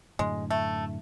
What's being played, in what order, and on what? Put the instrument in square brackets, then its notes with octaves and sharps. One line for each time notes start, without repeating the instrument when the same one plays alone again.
[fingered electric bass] F#2 A2 D3 [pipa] G#3
[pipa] A3